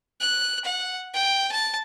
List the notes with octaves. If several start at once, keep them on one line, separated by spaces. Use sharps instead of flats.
F#6
F#5
G5
A5